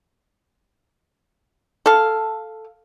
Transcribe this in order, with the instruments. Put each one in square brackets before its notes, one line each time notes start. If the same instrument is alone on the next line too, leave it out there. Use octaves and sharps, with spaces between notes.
[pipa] A4 F5